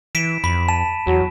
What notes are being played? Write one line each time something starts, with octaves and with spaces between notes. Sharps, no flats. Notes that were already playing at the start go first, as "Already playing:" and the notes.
E3 B6 D7 E7
F2 B5 B6
A5 E7
E2 F#3